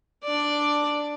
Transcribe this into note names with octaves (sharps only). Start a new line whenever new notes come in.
D4 D5